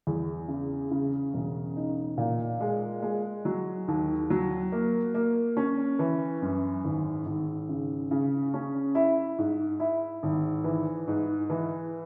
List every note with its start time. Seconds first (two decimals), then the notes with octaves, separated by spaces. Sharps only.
0.07 E2
0.48 C#3
0.91 C#3
1.34 E1
1.77 D#4
2.18 A#2
2.61 G#3
3.02 G#3
3.45 F#3
3.88 D#2
4.30 F#3
4.72 A#3
5.14 A#3
5.57 C#4
5.99 E3
6.42 F#2
6.84 G#1
7.26 G#1
7.69 C#3
8.11 C#3
8.54 C#4
8.95 E4
9.38 G#2
9.80 E4
10.23 G#1
10.64 E3
11.08 G#2
11.50 E3